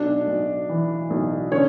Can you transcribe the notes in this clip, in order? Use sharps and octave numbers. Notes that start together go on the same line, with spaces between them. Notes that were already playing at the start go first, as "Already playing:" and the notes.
Already playing: B1 D4 D5
B1
E3
B1
D3 C#4 C#5